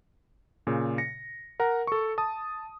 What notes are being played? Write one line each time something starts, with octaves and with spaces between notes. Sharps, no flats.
A#2 C#3
A#6 C#7
A#4 F#5 A#5
A4 C#6
A5 D#6